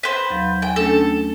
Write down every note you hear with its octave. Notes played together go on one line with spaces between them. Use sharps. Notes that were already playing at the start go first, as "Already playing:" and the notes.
B4 C5
D#2 F#3 F5
G5 G#5
A3 C#4 D4 A4